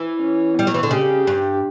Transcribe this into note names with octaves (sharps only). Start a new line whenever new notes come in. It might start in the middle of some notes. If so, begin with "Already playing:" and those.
Already playing: E3
C#4
G3 B3
F#3
E3
D3
C#3 G4
G2